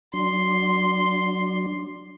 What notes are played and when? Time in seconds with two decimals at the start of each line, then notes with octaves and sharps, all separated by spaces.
0.13 F#3 D4 C6